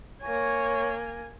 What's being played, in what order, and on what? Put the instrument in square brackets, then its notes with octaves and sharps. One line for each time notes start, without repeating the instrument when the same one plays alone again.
[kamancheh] A#3 G#5 [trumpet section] C#5